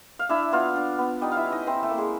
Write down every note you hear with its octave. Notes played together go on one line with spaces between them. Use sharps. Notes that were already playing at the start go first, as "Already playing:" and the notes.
F5
D4 E4 E5
B3 F4 F5
D4
B3
G3 D#4 D#5
F5
E4 E5
C#4
D#4 D#5
C4 E4 C5
A3 A4
A#3
G#3 G#4